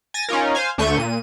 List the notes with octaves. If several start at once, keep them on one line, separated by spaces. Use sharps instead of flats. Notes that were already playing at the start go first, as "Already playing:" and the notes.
G#5 A6 A#6
C#4 D#4 F4 A#4
C5 F5 G#5
D2 D3 A3 C#6 G6 D#7
A#2 D#7